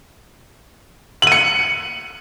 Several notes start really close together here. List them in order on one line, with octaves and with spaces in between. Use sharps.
F#7 D#7 C#7